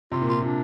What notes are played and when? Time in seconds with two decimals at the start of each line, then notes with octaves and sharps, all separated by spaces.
0.12 C3 F4
0.21 A#2
0.29 F4
0.41 A#2 D4